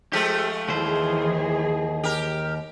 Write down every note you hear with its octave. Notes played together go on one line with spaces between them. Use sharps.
F3 G#3 A3 G4
D#2 E3 G#4 C5
G4 A#4